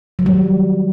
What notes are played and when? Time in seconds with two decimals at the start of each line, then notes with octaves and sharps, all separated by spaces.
0.19 F#3
0.22 D#3
0.26 G3